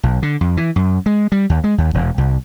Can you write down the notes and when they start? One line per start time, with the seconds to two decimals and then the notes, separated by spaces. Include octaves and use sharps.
0.03 B1
0.22 D3
0.41 F2
0.57 E3
0.76 F#2
1.06 G#3
1.32 G3
1.50 D#2
1.64 G#3
1.78 D#2
1.94 E1
2.18 C2